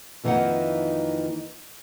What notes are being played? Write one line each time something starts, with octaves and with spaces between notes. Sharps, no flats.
F2 D#3 E3 A#3 D#4 F#5